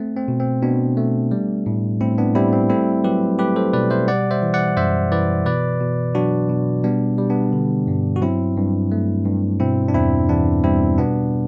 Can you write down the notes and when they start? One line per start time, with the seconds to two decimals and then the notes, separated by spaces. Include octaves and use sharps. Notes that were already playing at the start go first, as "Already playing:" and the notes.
Already playing: A3 C4
0.17 C4
0.28 B2
0.40 C4
0.62 B2 B3 D4
0.97 A3
1.31 G3
1.66 A2
2.01 A2 C4 E4
2.18 B3 D4
2.35 G3 C4 E4
2.53 C4
2.70 A3 C4 E4
3.04 F#3 G4 B4
3.39 A3 G4 B4
3.56 A4 C5
3.73 B2 B4 D5
3.90 C5 E5
4.08 G3 D5 F#5
4.31 C5 E5
4.42 E3
4.54 D5 F#5
4.77 F#2 C5 E5
5.11 E3 B4 D5
5.46 B2 B4 D5
5.80 B2
6.15 F#3 D4 F#4
6.49 B2
6.84 G3 B3 D4
7.18 G3
7.30 B3 D4
7.53 D3
7.88 G2
8.16 F#4
8.22 F#3 C4 E4
8.57 G2
8.92 A3
9.26 G2
9.60 B2 C4 E4
9.88 D4
9.94 E2 C4 E4
10.29 E2 B3 D4
10.64 G3 C4 E4
10.98 B2 B3 D4